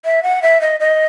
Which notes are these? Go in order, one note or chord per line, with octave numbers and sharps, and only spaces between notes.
E5
F#5
E5
D#5
D#5